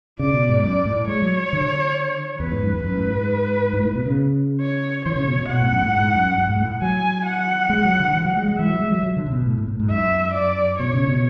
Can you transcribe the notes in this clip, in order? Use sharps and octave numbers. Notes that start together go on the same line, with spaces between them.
C#3 D5
B2
G#2
F#2 D5
A2
G#3 C#5
F#3
D3
E2 B4
G#2
F#2
E2
F#2 B4
A2
G#2
G#2
A2
B2
C#3
C#5
E3 C#5
C#3
B2
B2
B2 F#5
A2
F#2
A2
G#2
F#2
F#2
G#2
A2
F#3 G#5
F#5
G#3
F#3
D3
E3
F#3
G#3
G#3
E3 E5
F#3
G#3
F#3
F#3
D3
C#3
B2
A2
A2
A2
G#2
F#2 E5
D5
B2 C#5
C#3
B2